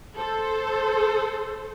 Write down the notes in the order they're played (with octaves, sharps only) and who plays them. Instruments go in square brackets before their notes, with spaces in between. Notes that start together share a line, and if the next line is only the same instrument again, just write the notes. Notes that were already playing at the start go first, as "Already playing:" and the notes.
[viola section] A4 C5